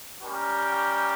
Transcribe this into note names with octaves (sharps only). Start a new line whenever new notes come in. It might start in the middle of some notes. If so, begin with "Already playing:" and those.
G3 C#4 G4 A#4